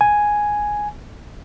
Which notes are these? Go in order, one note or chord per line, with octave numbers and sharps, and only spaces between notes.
G#5